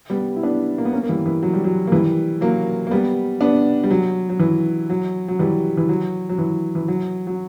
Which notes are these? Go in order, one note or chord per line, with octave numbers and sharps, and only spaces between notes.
G3 B3
E4
B3 D4
A#3
B3
A#3 C#4
A#3
E3 G3
E3
F#3
G3
F#3
A#3
E3 G3
F#3 A#3
A#3
G3 B3
B3 D4
G3
F#3
F#3
E3
F#3
F#3
E3 G3
E3
F#3
F#3
E3
E3
F#3
F#3